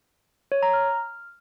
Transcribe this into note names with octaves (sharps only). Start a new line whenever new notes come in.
C#5
A#5
F6